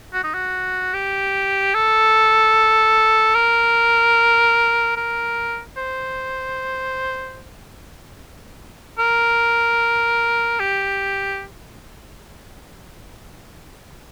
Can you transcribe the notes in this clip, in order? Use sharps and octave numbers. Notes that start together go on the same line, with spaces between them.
F#4
D#4
F#4
G4
A4
A#4
A#4
C5
A#4
G4